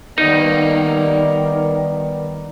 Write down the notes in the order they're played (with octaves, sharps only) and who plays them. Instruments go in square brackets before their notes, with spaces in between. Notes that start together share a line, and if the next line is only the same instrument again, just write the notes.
[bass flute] D#3 [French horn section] G3 B3 D5 [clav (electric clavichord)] D#4 [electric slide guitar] A#4 F5 F#5